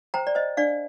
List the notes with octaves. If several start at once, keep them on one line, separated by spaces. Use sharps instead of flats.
C5 G5 A#5
D5
C5 D#5
D4 D5 F5